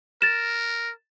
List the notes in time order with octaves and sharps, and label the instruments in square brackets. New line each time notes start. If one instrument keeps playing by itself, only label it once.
[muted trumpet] A#4 [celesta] A6 E7